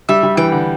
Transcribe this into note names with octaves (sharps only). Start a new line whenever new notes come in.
G3 E5
G3
E3 G5
D3